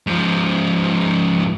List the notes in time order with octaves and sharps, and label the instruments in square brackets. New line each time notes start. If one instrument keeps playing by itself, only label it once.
[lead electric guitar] G#2 F3